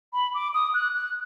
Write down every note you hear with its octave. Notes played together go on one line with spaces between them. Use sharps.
B5
D6
D#6
F#6
F#6